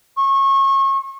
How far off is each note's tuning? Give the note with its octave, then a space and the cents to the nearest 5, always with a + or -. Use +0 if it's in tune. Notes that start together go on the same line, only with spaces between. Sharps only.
C#6 -30